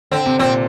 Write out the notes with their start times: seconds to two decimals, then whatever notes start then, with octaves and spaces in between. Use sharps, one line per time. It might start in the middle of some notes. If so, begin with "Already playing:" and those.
0.11 D3 C4
0.26 C3
0.39 A#2 C4